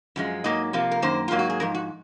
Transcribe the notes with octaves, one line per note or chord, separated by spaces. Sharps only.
F#2 F3 G#3
G#2 F#3 A#3 D#5
C3 F3 A#3
A#4
F#2 D#3 A#3 C5
G#2 F#3 A#3 F4
F#4
G#4
G#2 F3 A#4
F#4